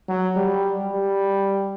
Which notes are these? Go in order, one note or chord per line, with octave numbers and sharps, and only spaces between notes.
F#3
G3
G3